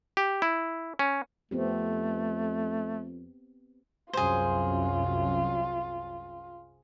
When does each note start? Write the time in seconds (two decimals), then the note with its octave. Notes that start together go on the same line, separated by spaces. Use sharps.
0.17 G4
0.42 E4
0.99 C#4
1.51 F2 A3 B3 C4 G4
4.13 C2 F#2 F4 G#4 C5